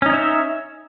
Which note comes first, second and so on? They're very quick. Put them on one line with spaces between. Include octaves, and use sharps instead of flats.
C#4 D#4 C#5 E5